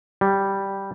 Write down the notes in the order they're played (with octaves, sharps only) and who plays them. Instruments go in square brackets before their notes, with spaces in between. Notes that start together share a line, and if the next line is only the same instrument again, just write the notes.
[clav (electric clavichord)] G3